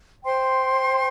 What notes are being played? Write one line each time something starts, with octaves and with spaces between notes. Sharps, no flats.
C5 G5 C6